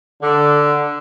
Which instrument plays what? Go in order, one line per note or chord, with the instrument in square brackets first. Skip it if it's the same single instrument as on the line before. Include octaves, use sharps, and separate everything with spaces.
[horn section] D3